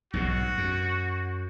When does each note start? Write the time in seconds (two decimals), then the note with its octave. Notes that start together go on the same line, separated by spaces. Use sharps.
0.13 B1 G#2 B2 F#4
0.58 F#2